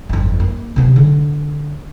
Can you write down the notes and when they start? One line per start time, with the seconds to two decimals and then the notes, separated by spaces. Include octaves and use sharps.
0.09 G1 F2
0.40 A#3
0.76 C3 B3
0.96 D3